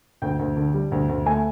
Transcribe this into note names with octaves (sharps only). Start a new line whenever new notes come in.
D2 G5
D2
D3
G3
D2
D2
A3 G#5